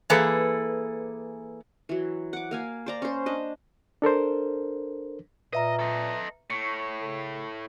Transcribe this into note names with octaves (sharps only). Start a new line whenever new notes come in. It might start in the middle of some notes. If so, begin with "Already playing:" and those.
E3 A#3 G#4 A4 B4
E3 F#3
F#5 D6
A#3 F5 G#5
C5 D5 A#5
C#4 C5
D4 D#5
D4 A4 A#4 C5
A#2 B4 D#5 E5 A#5
A4 D#5
A2 C#6 C#7
C#3 A4